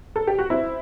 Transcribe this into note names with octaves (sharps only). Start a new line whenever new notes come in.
A4
G4
F#4
C4 E4